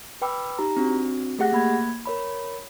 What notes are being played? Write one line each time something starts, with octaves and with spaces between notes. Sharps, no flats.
B4 G5 B5 D6 E6
D#4 G4 A#5
C4 D4 F#4
A3 G4 G#4 F#5 F#6 A#6
A#3 B5 G#6
A#4 C#5 B5